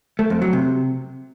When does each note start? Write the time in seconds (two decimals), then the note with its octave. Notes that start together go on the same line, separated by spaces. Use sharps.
0.19 A3
0.30 F2
0.42 F#3
0.53 C3